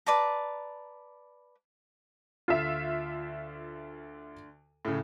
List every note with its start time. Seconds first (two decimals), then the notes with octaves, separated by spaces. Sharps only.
0.06 B4 D5 A5 A#5
2.48 D2 F4 E5
4.85 A2 C#3